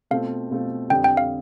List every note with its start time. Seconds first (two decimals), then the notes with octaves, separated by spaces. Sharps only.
0.11 B2 A3 C4 F4 A4 F5
0.51 B2 A3 C4 F4 A4
0.90 F2 D3 G3 G5
1.04 G5
1.17 F5